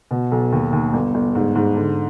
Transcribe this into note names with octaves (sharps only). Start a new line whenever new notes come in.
B2
B1
D#2
D#2
G1
G1
G#2
G#2
D3